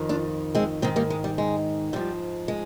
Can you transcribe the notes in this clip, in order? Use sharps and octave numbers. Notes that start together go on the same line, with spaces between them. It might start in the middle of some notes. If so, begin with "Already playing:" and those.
Already playing: F2 D#3
D4 F4
G#3 C4
G#2 D#3 G#3 C4
G3 A#3
G#3
G3
G#3
G#2 F3 G3
G#3